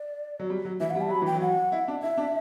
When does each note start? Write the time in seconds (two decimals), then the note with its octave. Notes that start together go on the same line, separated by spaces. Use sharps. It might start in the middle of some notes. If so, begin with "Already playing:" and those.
Already playing: D5
0.40 F#3
0.50 G3
0.65 F#3
0.80 E3 E5
0.90 F#5
0.95 G3
1.01 A5
1.08 F#3 B5
1.22 E3 G5
1.35 F#3
1.41 F#5
1.72 E4
1.88 D4
2.02 E4 E5
2.17 D4